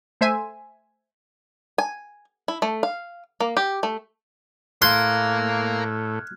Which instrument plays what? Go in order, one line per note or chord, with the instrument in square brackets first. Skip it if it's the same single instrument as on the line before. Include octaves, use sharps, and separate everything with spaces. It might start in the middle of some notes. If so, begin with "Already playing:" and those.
[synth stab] A3 C5 E5 G#5
[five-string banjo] G#5
E4
A3
F5
A#3
G4
A3
[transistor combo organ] A2 [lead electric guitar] A#4 F5 [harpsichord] C6 [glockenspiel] F6 F#6 G#6